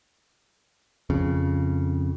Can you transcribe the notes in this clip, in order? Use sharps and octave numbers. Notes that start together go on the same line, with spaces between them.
F2 C#3